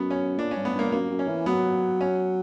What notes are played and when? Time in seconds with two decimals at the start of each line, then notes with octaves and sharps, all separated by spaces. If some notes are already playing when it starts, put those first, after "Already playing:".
Already playing: F#2 B3
0.10 C#4
0.38 A#2 D4
0.51 C#4
0.56 G2
0.65 B3
0.75 G2 A#3
0.92 F#2 A#3
1.10 F#2
1.19 C#4
1.28 E3
1.46 F#3 B3
2.01 C#4